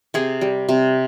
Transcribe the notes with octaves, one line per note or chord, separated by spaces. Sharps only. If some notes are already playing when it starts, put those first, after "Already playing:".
C3 G#4
G3
C3